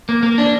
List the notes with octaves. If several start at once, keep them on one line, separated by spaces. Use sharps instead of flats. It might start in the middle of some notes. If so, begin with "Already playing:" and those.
A#3
A#3
D4